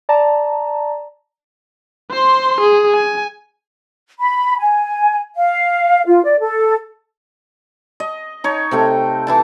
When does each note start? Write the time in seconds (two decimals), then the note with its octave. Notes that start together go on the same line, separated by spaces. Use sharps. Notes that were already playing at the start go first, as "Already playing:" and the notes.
0.09 D5 A5 A#5
2.11 C5 C6
2.61 G#4
2.93 G#5
4.19 B5
4.58 G#5
5.36 F5
6.06 F4
6.23 D5
6.40 A4
8.00 D#5
8.44 D#4 C#5
8.71 C3 A3 G5
9.27 E3 E4 A5